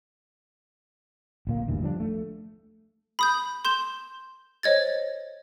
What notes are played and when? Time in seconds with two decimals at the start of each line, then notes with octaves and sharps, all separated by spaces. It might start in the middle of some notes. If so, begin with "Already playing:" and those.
1.47 D1 A#2 A#3
1.67 F#1 D2 G2 E3
1.82 F3 G3 B3 D4
2.00 A3
3.19 B5 D#6 G6
3.65 C6 G6 E7 G7
4.63 C5 C#5 D#5 G#6 A6